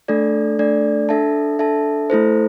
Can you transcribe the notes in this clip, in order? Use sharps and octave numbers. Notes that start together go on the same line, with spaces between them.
A3 D4 A4 D5
A3 D4 A4 D5
D4 A4 E5 A5
D4 A4 E5 A5
A3 E4 A4 C5